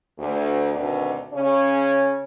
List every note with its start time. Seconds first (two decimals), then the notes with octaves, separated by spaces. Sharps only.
0.19 D2
0.73 D2 B2 D#3 C4 D4
1.33 C#3 C#4